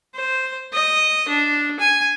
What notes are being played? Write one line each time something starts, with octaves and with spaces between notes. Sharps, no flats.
C5
D#5
D4
G#5